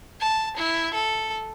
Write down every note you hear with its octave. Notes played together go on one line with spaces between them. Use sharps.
A5
E4
A4